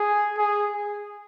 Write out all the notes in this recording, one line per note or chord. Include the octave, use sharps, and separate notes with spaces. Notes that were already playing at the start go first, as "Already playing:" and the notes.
Already playing: G#4
G#4